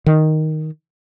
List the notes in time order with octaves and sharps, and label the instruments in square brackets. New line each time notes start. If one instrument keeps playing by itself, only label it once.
[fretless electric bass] D#3